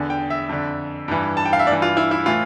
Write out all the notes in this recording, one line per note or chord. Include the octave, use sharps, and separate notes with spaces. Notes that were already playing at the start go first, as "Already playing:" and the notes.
Already playing: E2 D3
G5
E5
F2 D3
G2 E3
A5
G5
F5
E5
G2 D5
E3
F4
E4
E4
A2 E3 F4